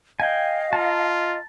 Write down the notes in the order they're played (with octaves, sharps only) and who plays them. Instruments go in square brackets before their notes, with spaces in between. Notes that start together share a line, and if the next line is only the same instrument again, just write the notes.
[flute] D#5 [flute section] F5 [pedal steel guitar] G5 G#5
[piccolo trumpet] F4 [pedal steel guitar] A5 A#5